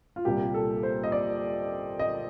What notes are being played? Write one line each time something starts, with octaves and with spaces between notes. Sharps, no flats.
F4
C2 A#2 G3 A#3 G4
A4
C5
D#5
D5
D#5